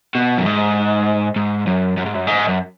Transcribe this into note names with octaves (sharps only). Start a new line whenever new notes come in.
B2
F#2
G#2
G#2
F#2
F#2
G#2
F#2
G#2
F#2